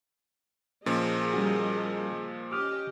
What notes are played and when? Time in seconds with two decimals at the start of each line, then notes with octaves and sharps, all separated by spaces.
0.86 A#2 F3 C#4 G#4 A#4 D#5
1.34 G3 C#4 F#4
2.52 C#4 G4 D#5 D6 D#6 F6